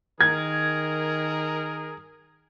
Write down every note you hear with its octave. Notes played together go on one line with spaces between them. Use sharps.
D#3 G#4 A#4 G#6